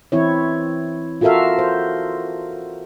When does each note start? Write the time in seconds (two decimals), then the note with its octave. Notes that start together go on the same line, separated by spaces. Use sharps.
0.12 E3 C4 E4 C#5
1.21 F4 F#4 A4 A#4 E5 F5
1.59 C5